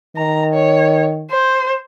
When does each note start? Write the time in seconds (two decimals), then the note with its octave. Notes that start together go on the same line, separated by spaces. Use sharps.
0.17 D#3 A#5
0.53 C#5
1.31 C5